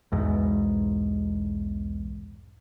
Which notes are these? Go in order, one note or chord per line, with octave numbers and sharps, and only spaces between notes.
B1 E2 G#2